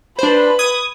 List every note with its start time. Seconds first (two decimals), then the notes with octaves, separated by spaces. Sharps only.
0.19 D4 B4 C5 B5
0.59 D#6 G#6